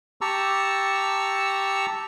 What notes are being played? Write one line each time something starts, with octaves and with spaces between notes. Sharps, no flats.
G4 A5 A#5 C#6 E6